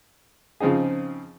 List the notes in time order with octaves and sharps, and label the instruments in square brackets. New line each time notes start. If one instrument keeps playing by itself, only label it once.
[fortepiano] C#3 F3 C4 D#4 G#4